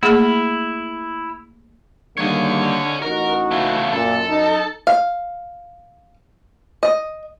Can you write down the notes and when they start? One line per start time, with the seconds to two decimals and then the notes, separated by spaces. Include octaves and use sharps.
0.03 A3 A#3 E4 G#4 E6 F6
2.18 D3 D#3 G3 A#3 C#5 D#5
3.02 A1 D#4 F#4 A#4
3.51 C#3 A3
3.93 F#2 A#2 A4
4.29 D#4
4.87 F5
6.83 D#5